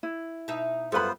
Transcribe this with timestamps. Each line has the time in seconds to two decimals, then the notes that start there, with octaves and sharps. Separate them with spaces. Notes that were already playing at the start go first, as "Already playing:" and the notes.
0.03 E4
0.48 B2 D#4 E5
0.92 F#2 G3 B3 F4 A4 B4 C5 B5